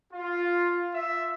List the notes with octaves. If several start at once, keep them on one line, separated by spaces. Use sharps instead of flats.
F4
E5